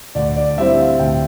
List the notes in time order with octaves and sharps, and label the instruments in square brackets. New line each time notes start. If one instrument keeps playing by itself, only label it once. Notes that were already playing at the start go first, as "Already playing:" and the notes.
[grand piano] D2 D5
D5
D3 G3 C4 E4 E5
F5
D2 G5